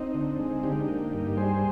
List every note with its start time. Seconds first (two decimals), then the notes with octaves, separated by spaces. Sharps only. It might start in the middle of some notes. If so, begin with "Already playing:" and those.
Already playing: C4 D#4
0.15 D3
0.40 G#3
0.63 D3 D#4 G4
0.88 A#3
1.13 G2
1.37 G3 G#4 C5